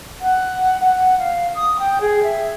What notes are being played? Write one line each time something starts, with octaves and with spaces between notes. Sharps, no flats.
F#5
F#5
F5
D#6
G5
G#4
E5